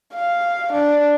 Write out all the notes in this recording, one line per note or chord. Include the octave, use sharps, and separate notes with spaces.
F5
D4